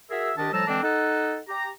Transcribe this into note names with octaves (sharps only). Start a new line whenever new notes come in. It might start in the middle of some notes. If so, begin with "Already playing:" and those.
F#4 G#4 A#4 E5
C2 D#3 D4 G4 D#5 A5
A2 F3 G3 A5 A#5 E6
D3 E3 G#3 C4 D4
D#4 A4 F#5
G4 A#5